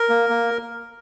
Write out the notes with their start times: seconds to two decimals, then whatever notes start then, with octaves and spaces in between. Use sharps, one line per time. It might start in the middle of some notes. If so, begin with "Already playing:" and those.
Already playing: A#4
0.09 A#3
0.30 A#3